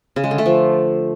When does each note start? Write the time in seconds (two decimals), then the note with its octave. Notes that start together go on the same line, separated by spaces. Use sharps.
0.16 C#3
0.24 G#3
0.31 D3
0.38 A3
0.46 F3